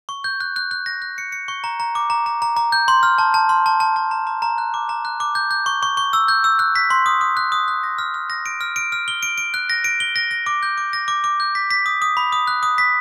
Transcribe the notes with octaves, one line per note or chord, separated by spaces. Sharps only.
C#6
G6
F#6
F#6
F#6
A#6
F#6
C#7
C#7
C#6
A#5
A#5
D6
A#5
A#5
A#5
A#5
G6
C6
F6
A5
A5
C6
A5
A5
A5
A#5
A#5
A#5
F#6
D6
A#5
F#6
D6
G6
G6
C#6
C#6
C#6
E6
G6
E6
F#6
B6
C6
D#6
D#6
F#6
D#6
F#6
A#6
F6
F6
A#6
D7
F6
D7
F6
G7
D7
D7
F#6
A#6
D7
G7
A#6
A#6
D6
G6
D6
A#6
D6
D6
G6
B6
B6
D#6
D#6
B5
D#6
F#6
D#6
B6